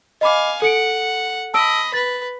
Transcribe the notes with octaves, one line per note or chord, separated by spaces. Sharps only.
D#5 F5 G#5 B5 D6
A4 F#5 C#7 D7
D#5 A5 B5 E6 D7
B4 A6